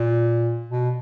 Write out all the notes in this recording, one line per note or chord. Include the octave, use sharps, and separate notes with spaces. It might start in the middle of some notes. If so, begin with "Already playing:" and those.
Already playing: A#2
B2